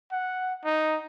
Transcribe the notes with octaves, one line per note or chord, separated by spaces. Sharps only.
F#5
D#4